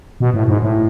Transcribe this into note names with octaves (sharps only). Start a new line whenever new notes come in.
B2
A2
G#2
A2